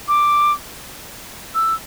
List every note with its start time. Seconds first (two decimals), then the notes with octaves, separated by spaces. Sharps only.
0.08 D6
1.55 E6